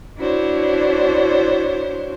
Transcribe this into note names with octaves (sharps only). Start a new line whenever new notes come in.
D4 E4 F#4 C5 C#5